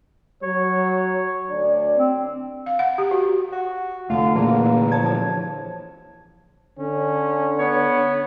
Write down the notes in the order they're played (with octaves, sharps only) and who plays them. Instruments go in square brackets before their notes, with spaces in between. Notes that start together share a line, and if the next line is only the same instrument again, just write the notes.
[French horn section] F#3 [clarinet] C#5
[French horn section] D2 D4 D5
[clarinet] C4
[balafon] F5
F#5
G4
F#4
[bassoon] F#4
[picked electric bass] F1 [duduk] D3 [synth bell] A3 [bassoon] F4
[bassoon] E2 [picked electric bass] A#2 D3 E3 [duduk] A#3
[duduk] F3 [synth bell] C#5 A5 G#6
[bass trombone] D3 [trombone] C#4
[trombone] B3 [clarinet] C#5